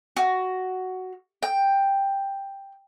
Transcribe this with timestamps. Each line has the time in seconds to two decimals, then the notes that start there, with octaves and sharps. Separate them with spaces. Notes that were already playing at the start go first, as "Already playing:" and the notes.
0.17 F#4
1.43 G5